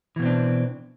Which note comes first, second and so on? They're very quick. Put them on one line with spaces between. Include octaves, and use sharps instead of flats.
E3 B2 C4 D4